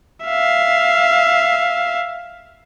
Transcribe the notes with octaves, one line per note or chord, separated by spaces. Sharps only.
E5 F5